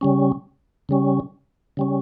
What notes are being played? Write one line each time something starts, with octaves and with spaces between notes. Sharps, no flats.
C#3 G3 C#4
C#3 G3 C#4
C#3 G3 C#4